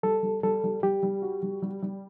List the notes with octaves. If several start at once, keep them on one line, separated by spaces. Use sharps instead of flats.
G3 A4
G3
G3 A4
G3
G3 G4
G3
F#4
G3
G3
G3